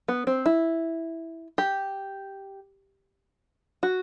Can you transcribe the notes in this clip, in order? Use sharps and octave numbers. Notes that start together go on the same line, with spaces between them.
B3
C4
E4
G4
F#4